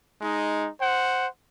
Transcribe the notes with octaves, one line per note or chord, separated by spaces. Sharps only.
G#3 D#4
C5 F#5